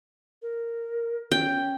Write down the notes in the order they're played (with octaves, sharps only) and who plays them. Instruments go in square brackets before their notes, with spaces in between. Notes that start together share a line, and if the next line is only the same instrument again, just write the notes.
[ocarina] A#4
[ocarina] C#4 [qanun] G5